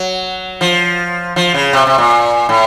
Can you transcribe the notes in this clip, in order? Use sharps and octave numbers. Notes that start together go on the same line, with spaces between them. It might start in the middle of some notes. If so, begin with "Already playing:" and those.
Already playing: F#3
F3
F3
C#3
C3
C3
A#2
A2